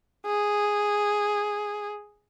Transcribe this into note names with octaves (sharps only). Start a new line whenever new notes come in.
G#4